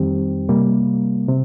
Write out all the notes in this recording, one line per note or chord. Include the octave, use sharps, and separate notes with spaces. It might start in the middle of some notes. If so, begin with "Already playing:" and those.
Already playing: F2 D#3 G3 C4 G4
C3 G3 A#3
C3